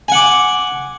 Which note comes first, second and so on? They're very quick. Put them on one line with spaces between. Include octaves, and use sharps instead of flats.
G#5 F#5 D6